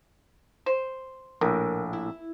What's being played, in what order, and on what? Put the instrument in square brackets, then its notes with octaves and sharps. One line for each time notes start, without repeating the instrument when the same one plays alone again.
[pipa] C5
[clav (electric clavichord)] A#1 A2 [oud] A#4
[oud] E4